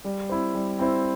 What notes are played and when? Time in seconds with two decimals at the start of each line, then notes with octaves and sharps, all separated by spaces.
0.05 G3
0.29 C4 E4 C5
0.55 G3
0.79 C4 E4 C5